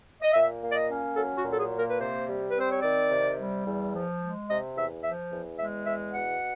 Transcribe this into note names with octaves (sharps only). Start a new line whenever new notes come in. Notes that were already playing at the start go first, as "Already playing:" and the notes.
D#5
A#2 E5
A#3
D5
D#5
C#4
F#3 A4
F#4
A#2
A4
G#4
A#3
A#4
B4
C3 C5
G3
B4
C4
C5
C#5
D#3 D5
C3
G3
E2
F3
G#3
C3 D#5
E2 E5
F3 E5
E2
G#3 E5
E2 E5
B2 F#5